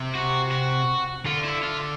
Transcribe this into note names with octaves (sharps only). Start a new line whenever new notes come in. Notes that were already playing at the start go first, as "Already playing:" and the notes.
Already playing: C3
F#4
F#4
D3 F4
E4
F4